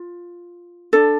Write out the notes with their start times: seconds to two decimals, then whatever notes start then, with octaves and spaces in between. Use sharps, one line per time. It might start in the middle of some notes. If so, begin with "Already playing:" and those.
Already playing: F4
0.93 D4 A4